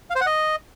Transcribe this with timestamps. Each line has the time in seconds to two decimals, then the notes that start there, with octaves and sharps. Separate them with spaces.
0.10 F5
0.15 C5
0.21 F#5
0.26 D#5